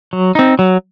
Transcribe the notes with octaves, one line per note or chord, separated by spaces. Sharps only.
F#3
C4 D#4
F#3